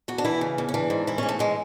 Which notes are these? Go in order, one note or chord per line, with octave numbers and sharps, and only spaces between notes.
E2 F#4
D4
E3 E4
C#3
E2
C#4
E3 D4
G#2
E3 E4
G#2 C#4
A3
E3 G#3